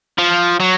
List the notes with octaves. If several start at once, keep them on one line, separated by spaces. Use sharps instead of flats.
F3
F#3